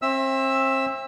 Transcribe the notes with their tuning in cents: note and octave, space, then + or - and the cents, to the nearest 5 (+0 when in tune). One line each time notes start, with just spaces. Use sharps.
C4 +35 E5 +0 E6 +0